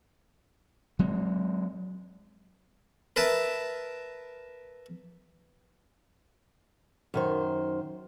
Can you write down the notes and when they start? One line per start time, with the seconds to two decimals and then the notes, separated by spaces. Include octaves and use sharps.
0.99 F#3 G#3 C4
3.16 A#4 B4 E5 A5
7.14 F#2 D#3 C5